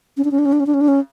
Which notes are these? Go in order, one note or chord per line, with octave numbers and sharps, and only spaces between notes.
C#4
D4
C#4
D4
C#4
D4
C#4
D4
C#4
D4
C#4